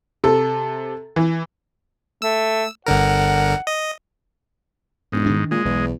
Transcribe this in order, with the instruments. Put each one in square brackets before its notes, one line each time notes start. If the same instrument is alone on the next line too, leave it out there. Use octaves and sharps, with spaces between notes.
[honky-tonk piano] C3 A4
E3
[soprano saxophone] A3 [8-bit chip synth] E6
[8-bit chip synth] G1 D3 A#4 [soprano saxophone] F#5
[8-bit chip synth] D#5
[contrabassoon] E1 [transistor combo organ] G#2
[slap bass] D#3 D4
[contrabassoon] A#2 [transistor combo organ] G#3
[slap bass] B1 [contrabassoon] E2